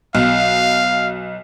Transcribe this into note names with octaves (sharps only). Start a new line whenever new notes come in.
B1 F5